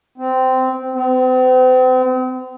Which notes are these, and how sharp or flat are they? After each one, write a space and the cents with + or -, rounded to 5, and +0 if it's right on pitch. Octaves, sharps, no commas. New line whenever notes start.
C4 -15
C4 -40